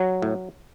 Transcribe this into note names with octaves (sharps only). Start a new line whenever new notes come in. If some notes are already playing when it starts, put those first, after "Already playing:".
Already playing: F#3
A2